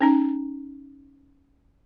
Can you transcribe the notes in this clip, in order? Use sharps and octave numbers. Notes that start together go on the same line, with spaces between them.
C#4 D#4 A#5